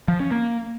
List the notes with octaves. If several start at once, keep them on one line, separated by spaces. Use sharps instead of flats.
F3
C#4
A#3